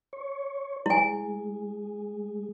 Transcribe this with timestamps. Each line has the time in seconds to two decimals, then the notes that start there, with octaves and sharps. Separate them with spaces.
0.13 C#5
0.86 G#3 E4 G#5